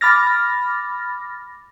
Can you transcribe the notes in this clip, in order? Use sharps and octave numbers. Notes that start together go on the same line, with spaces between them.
B5 D6 F6 A6 A#6